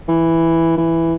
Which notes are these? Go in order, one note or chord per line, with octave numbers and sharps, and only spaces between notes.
E3
E3